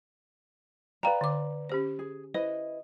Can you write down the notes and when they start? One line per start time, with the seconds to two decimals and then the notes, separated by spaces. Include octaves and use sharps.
1.03 B4 D5 F5 G5 A#5
1.21 D3 D6
1.69 C#4 G4 C5
1.99 G#4
2.34 E4 B4 C5 D#5